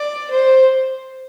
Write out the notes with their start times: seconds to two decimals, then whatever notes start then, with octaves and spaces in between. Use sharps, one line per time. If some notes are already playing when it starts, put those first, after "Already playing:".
Already playing: D5
0.31 C5